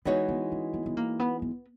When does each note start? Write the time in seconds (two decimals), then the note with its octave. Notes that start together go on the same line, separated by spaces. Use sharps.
0.05 E3 G#3 B3 D#4 F#4 C#5
0.28 B3
0.52 C#4
0.74 B3
0.86 B3
0.97 A#3
1.20 B3
1.42 B3